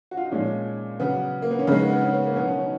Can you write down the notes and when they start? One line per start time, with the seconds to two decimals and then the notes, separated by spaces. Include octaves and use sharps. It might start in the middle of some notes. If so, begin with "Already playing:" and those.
0.11 F#4
0.17 F4
0.25 D#4
0.31 A#2 F3 G#3 C#4
1.00 C#3 F#3 B3
1.42 A#3
1.51 B3
1.59 C#4
1.67 C#3 G#3 D#4
1.79 B3
1.90 B3
2.01 C#4
2.13 B3
2.25 A#3
2.36 B2 F#3 B3
2.47 C#4
2.58 D#4